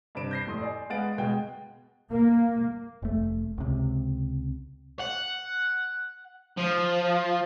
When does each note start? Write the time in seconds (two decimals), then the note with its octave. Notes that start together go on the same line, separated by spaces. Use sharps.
0.15 G2 C3 C5 D7 E7
0.31 G6 A#6 C7
0.47 F1 A2 A4 C6 D#6
0.62 D5 G#5
0.90 G#3 B3 F5 F#5 A6 D7
1.18 B2 G#3 G5
2.10 A#3
3.02 F1 A3
3.58 C#2 C3
4.99 F#5
6.58 F3